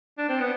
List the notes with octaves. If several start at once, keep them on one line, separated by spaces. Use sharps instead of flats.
D4
C4
B3